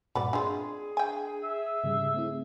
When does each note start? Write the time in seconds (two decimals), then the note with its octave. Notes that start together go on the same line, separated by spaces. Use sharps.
0.15 G2 A#2 F#4 B4 D5
0.33 G#3 C4 D4 F4 G#4
0.97 G5 G#5
1.43 E5
1.84 G#2 C#3 G3
2.14 A3 C4 E4